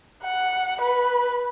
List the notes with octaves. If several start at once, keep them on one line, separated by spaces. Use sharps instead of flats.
F#5
B4